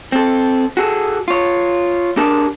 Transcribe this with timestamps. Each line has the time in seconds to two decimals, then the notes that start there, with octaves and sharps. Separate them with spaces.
0.12 C4 A4
0.77 F#4 G#4 A4
1.28 F4 C#5
2.17 D4 G4 G#4 A#4 A5